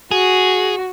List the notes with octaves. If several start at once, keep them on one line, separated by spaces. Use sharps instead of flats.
F#4 G#4